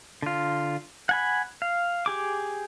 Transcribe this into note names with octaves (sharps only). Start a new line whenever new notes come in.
D3 F4
F#5 G#5 B5
F5
G4 G#4 D6